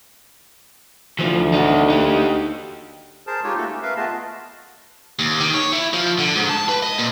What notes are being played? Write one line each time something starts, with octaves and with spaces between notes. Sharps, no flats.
D2 E3 F3
D#4 F#4
D#4 G4
G#4 A#4 C5 A5
G#3 D#4 F4 G4 C#5
A3 A#3 F#4 A4
C#4
A#4 B4 E5 F5
A3 B3 F4 G#4 D#5 A5
D#2
D#3
C#5
E4
F3
D3
G#2
A5
B4
D#5
A#2